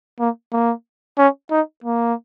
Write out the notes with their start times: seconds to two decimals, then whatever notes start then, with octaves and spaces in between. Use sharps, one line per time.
0.19 A#3
0.53 A#3
1.18 C#4
1.51 D#4
1.84 A#3